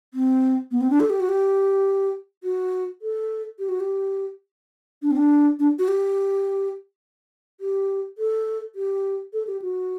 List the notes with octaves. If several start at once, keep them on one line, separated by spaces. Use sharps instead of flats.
C4
B3
C4
D4
A4
G4
F#4
G4
F#4
A4
G4
F#4
G4
D4
C4
D4
D4
F#4
G4
G4
A4
G4
A4
G4
F#4